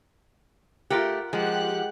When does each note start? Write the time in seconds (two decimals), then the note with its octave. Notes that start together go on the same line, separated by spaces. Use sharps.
0.90 A3 F4 G4 A#4 F#5
1.33 F3 G#3 G4 F#5 F#6